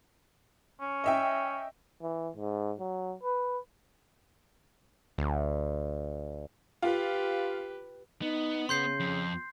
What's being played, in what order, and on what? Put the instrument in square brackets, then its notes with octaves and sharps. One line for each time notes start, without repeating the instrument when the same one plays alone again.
[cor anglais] C#4
[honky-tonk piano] D#5 E5 G5
[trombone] E3
G#2
F#3
B4
[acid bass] D2
[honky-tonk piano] F4 [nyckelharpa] G4 B4
[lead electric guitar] B3 [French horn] D#4
[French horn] C#3 [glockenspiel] C6 G6 C7
[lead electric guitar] F2